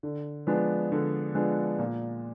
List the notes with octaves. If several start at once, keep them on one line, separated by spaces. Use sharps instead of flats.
D3
F3 G#3 B3 D4
D3
F3 G#3 B3 D4
A#2